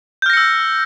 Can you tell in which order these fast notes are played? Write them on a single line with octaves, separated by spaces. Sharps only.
G6 F6 A#6 C#7 E6